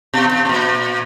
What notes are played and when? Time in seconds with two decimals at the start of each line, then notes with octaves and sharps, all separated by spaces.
0.14 B2
0.32 B2
0.45 B2
0.49 A#2